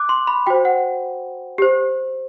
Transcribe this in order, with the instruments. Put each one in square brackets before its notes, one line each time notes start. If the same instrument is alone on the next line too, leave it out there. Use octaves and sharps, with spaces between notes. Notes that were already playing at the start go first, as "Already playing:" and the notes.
Already playing: [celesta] D6 F#6
C6
B5
F#4 C5 G5
F#5
G4 C5